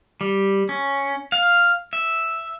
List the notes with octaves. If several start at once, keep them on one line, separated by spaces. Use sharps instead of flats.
G3
C#4
F5
E5